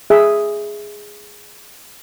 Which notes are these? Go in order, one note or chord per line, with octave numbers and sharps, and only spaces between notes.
G#4 E5